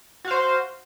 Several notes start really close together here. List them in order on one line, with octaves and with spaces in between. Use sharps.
F#4 F5 C5